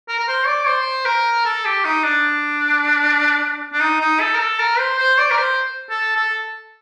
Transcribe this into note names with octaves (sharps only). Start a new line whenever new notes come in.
A#4
A#4
C5
D5
C5
A#4
A4
G4
D#4
D4
D4
D#4
D#4
A4
A#4
A4
A#4
C5
C5
D5
A#4
C5
A4
A4